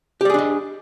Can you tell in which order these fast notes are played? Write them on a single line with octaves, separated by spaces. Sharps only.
G4 D5 G#4 D4 D#5